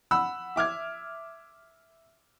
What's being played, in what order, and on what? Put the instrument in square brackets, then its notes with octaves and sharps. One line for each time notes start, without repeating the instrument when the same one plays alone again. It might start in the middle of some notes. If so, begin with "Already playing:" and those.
[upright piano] F#5 B5 E6
E5 D6 F6 G#6